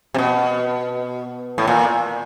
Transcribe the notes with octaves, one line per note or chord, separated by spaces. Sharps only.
C3
B2
A2
A#2